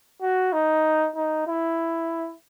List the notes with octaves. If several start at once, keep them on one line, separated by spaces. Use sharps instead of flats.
F#4
D#4
D#4
E4